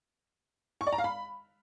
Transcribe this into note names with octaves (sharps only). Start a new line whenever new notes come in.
C#6
D5
A#5
F5
B5